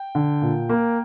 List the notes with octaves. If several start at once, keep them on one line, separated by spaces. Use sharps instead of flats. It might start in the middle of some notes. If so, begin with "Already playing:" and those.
Already playing: G5
D3
A#2
A#3